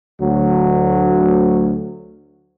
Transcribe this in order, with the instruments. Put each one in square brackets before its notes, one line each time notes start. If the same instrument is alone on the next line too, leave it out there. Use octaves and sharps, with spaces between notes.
[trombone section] D2 F#3